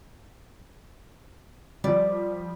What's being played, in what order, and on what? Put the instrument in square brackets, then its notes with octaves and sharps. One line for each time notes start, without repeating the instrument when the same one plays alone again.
[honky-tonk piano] F3 G3 [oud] D5